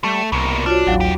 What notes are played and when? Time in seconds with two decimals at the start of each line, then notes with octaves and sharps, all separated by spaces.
0.04 G3 A3
0.32 C2 B2 A#3
0.66 D4 F4 F#4 C#5
0.87 A1 D#2 F#3 F5
1.01 F2 G4